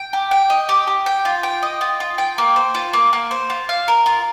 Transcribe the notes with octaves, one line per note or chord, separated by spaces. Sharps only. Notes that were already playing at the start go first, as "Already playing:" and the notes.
Already playing: G5
G4
G5
D#5
G4
G4
G5
F4
G5
D#5
F4
F4
G5
A#3
C5
F4
A#3
A#3
C5
F4
F5
A#4
F4